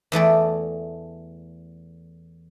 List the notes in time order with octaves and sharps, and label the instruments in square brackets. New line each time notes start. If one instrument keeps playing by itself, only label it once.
[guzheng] E2 E3 A3 D5